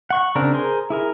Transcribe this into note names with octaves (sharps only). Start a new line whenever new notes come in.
F#5 C#6
C#3 C4 D4 A#4
G#4 A#4 C5 C6
E4 G#4 A#4